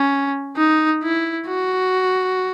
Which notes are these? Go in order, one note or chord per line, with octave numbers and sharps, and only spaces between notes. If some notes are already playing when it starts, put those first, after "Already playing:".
Already playing: C#4
D#4
E4
F#4